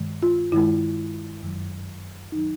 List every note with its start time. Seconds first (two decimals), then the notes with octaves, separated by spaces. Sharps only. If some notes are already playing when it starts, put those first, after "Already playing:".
Already playing: G2 D#3 G#3
0.23 F4
0.52 G2 D#3 G#3 E4
1.43 F#2 D#3 F#3
2.32 D#3 F#3 D#4